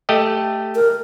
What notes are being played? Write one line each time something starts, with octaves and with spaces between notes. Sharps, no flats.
A3 G4 D#5
A#4